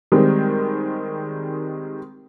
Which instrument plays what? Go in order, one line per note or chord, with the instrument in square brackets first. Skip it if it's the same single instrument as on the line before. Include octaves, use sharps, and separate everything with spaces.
[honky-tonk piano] D#3 G3 G#3 C4